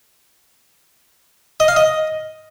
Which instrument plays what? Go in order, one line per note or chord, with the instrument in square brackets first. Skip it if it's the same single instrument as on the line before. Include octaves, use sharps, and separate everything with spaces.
[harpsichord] D#5
F5
D#5